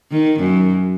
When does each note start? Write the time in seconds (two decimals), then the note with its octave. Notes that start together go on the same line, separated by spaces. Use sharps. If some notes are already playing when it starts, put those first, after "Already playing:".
0.11 D#3
0.40 F#2